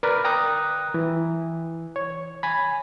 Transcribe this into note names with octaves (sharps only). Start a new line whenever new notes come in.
A#4 B4 D5
G5 A#5 D#6 F#6
E3
C#5
G#5 B5